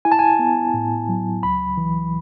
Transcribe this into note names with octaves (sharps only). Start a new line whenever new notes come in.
E4 G#5
A5
G#5
B3
A2
F#3
C#2 B5
E3